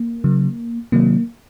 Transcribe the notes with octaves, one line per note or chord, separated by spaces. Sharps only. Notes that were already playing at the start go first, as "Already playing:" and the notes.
Already playing: A#3
C#3 F#3
C3 D#3 F#3 A#3